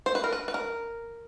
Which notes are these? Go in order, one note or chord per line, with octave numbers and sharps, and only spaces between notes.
C5
B4
A#4
B4
B4
A#4